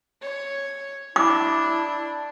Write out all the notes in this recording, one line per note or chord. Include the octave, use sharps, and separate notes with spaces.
C#5
D4 E4 D6